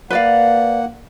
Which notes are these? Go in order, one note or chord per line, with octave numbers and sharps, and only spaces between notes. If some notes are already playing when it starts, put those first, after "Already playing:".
A#3 B4 D5 F5 F#5